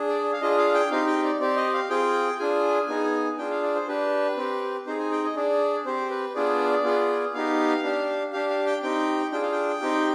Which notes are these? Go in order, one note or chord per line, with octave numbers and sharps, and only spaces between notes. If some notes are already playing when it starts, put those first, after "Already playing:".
Already playing: D4 G#4
D5
F5
D4 F4 G#4 D#5
F5
G5
C4 D#4 G4 F5
G5
D5
C4 G4 D5
D#5
F5
C4 F4 G#4 G5
D4 F4 G#4 G#5
B3 D#4 G#4
D4 F4 G#4 G5
F5
D5
C5
D4 G4 B4
C4 G4
C4 D#4 G#4 C5
G#5
G5
D#5
D4 G#4 D5
C4 G4 C5
B4
B3 D4 F4 G#4 D5
B3 F4 G#4
B3 D#4 G4 F5
D4 G4
D4 G4 F5
F5
G5
C4 D#4 G4 G5
D4 F4 G#4 G5
F5
G5
C4 D#4 G4